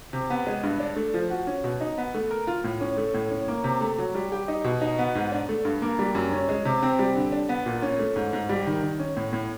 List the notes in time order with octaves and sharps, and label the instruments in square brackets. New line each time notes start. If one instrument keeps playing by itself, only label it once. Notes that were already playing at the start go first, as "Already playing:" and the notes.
[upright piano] C3
B3
G#3
G2
D4
A3
F3
F#4
C#4
B2
D#4
B3
A3
A#4
F4
A2
C#4
A3
A2
C#4
A#3
C3
A3
F#3
G3
G4
D#4
B2
D#4
B3
G#2
D4
A3
G2
A#3
G3
F#2
C#4
G#3
C3
C4
G3
D3
D4
B3
A#2
C#4
A3
G#2
G#2
G3
D#3
D#3
C#4
A2
A2